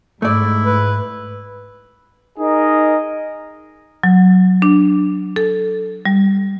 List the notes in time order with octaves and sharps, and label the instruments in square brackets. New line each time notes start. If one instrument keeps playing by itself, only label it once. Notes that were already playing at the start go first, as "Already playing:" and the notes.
[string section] G#2 [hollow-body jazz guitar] A3 D5 [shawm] E4
[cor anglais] B4
[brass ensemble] D#4 G#4 A#4 D#5
[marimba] F#3
D4
A4
G3